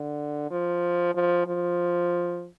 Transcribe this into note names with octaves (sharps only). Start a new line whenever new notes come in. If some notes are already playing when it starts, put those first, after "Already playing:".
Already playing: D3
F3
F3
F3